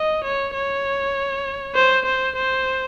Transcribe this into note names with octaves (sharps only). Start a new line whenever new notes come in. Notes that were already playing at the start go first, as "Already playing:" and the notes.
Already playing: D#5
C#5
C#5
C5
C5
C5